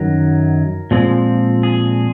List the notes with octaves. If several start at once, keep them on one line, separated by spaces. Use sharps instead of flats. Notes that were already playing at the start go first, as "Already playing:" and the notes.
Already playing: F#2 D#3 F#3 A#4
A#2 F3 G#3 C4
G#4